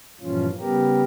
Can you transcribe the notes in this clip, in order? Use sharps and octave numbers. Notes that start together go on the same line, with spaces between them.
G2 A#2 E3 F3 C#4 F4
C#3 G3 B3 G4 A#4